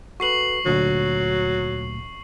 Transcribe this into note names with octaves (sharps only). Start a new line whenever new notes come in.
F#4 A4 B4 C#6 C7 F#7
D2 A#2 D3 F#3